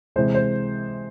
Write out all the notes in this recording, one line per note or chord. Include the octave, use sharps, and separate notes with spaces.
C3 E3 G#3 C5
C5